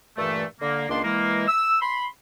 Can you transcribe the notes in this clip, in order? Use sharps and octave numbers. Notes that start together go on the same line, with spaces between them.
G2 A#2 E3 A3
D3 A#3
C#2 D#3 A#3 D4 D5 C6
E3 G#3 A#3
E6
B5 C6